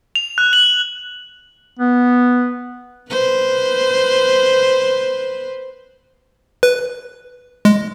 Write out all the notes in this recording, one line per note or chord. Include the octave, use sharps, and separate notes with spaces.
F7
F#6
F#7
B3
B4 C5
B4
G#3